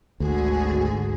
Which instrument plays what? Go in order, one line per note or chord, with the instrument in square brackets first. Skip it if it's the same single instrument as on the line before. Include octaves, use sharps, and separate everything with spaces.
[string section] G#1 D3 G#4 [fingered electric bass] D2 [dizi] F#4